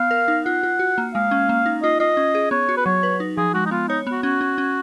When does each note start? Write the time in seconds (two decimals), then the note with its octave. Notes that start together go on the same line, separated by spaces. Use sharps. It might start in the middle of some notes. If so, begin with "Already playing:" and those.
Already playing: B3 F5
0.11 A#4
0.28 D#4
0.45 F4 F#5
0.63 F4
0.79 F#4
0.98 A#3
1.15 G#3 F5
1.31 C#4
1.49 A#3
1.66 D#4
1.83 F4 D#5
2.00 F4 D#5
2.17 C#4
2.35 G#4
2.51 B3 C#5
2.69 F#4
2.77 B4
2.86 F#3 C#5
3.03 B4
3.20 D#4
3.37 F3 G#4
3.54 G#3 F#4
3.66 D#4
3.71 B3 F4
3.89 D#4 C#5
4.07 B3
4.12 F#4
4.23 C#4 F#4
4.41 C#4
4.58 C#4